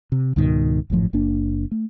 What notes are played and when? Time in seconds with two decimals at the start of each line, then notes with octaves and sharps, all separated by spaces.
0.12 C3
0.36 C#2 G#2 B2 D#3
0.90 G#1 F#2 A2 F3
1.13 F#1 A#3 D4
1.72 A3